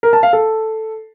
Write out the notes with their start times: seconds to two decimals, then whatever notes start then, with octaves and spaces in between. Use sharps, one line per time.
0.03 A#4
0.13 A5
0.23 F5
0.33 A4